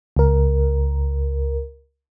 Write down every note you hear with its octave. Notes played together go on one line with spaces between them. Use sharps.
C#2 A#4